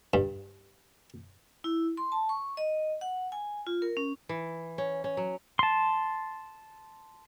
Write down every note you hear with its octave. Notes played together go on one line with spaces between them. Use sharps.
G2
E4
C6
A5
C#6
D#5
F#5
G#5
F4
A#4
C#4
E3
C#4
C#4
F#3
A5 C6